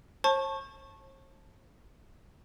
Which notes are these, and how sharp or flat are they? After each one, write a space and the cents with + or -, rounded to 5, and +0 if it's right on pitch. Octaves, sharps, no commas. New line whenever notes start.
C5 +45 A5 +0 C#6 -15